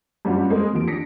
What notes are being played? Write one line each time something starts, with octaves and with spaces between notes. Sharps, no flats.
G2 G3 C#4 F4 F#4
G#3 A#3 C4 A#4
D#2 F3 D7
D4 A#6 B6 C#7